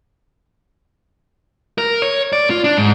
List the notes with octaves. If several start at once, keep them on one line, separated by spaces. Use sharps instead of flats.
A#4
C#5
D5
F4
D4
G#2